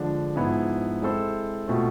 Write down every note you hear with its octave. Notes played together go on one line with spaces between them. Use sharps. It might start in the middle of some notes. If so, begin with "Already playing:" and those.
Already playing: D3 F3 G#3 D4
G#2 F3 B3 E4 G#4
G#3 C4 E4 A4 C5
B2 A3 C4 F4